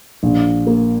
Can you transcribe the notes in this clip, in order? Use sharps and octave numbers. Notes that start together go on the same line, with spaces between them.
A#1
A#3